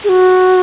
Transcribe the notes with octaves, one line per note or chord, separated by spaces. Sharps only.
G#4
F#4